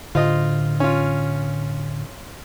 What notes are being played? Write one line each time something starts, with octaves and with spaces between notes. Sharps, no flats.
A2 D3 F4 C5 D#5
C#4 F4